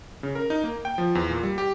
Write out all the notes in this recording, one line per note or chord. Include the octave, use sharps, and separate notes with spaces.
C#3
A#4
D#4
A#3
G5
F3
E2
A#2
G3
G4